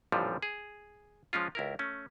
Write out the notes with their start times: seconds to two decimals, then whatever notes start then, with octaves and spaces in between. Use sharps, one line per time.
0.12 A1 F2 A#2 D3 F3 G3
0.43 G#4
1.33 F3 G#3 C#4 F4
1.55 C#2 E4 A#4
1.79 A3 C#4